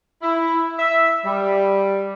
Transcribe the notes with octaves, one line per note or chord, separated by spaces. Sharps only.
E4
E5
G3